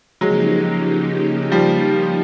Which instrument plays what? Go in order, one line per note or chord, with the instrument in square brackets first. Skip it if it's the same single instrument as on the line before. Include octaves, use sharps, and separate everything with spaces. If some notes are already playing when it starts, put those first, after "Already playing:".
[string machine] C#3 F3 A#3 D#4 G4 [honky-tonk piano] F#3 G#3
[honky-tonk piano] F3 G3